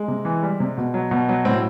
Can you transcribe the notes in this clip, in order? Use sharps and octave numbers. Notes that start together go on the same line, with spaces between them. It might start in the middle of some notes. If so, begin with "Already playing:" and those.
Already playing: G#3
C3
E3
G3
C3
B2
F#3
B2
F#3
A2 C4